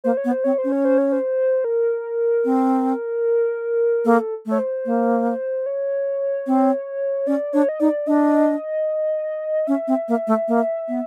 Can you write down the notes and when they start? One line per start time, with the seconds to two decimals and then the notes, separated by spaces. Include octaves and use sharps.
0.04 A#3 C5
0.17 C#5
0.24 B3
0.31 C5
0.44 C4 C#5
0.58 C5
0.64 C#4
0.72 C#5
0.85 C5
0.98 C#5
1.12 C5
1.64 A#4
2.45 C4
4.05 A#3 A4
4.46 A3
4.51 C#5
4.59 C5
4.86 A#3
5.66 C#5
6.47 C4
7.27 C#4 D5
7.53 D4 C#5
7.69 D#5
7.80 D#4 D5
8.07 D4 D#5
9.67 C#4 E5
9.87 C4
10.08 A#3
10.27 A3
10.48 A#3
10.88 B3